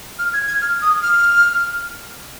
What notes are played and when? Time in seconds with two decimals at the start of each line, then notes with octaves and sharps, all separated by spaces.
0.19 F6
0.33 G#6
0.47 G#6
0.62 F6
0.82 D#6
1.03 F6